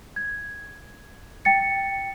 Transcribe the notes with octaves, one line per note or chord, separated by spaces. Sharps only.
G#6
G5 A6 C#7